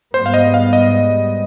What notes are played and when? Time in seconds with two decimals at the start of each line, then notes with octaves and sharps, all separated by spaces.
0.14 G#2 G3 B3 C5
0.26 F5
0.34 D#5
0.54 F5
0.73 D#5